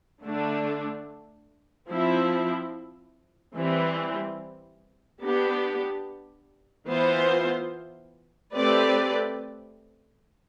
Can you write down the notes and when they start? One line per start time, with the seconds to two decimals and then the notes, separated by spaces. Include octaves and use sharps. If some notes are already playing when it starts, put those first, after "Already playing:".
0.24 D3 A3 D4
1.89 F3 C4 E4
3.57 E3 G3 C4
5.22 B3 D4 G4
6.88 E3 B3 F4 C5
8.55 A3 C4 G4 B4 D5